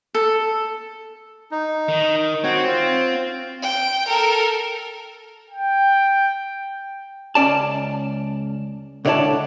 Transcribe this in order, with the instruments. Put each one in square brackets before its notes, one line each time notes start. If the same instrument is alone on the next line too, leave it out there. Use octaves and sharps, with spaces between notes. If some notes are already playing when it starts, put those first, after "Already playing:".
[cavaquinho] A4
[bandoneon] D#4
[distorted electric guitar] D#3
[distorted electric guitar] C4 [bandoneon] F#4 C#5
[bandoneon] F4
[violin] G5
A4 A#4
[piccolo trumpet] G5
[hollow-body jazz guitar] C#2 C#4 D5 A5
C#2 D3 E4 C#5 D5 A5